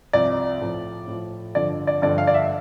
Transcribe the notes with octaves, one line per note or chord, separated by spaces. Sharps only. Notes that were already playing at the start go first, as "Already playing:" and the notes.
C2 C3 F3 D5
A2 F3
A2 F3
G2 D3 F3 D5
D5
G2 D3 F3 D5
F5
D5
E5